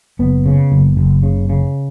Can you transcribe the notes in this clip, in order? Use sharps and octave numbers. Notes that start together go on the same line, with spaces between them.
F#1 B3
C#3
F#1
F#1
C#3
C#3